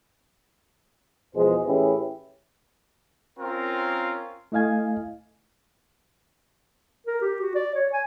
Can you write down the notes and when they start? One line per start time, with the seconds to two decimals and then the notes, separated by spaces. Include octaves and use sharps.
1.35 E2 B2 F3 G#3 G#4 C5
1.66 A2 E3 C#4 E4 G4 G#4
3.39 C4 C#4 F4 A#4
4.52 A3 E4 D#5 F5 G#5 G#6
7.07 A#4
7.21 G4
7.41 F#4
7.55 D5
7.75 C#5
7.93 G#5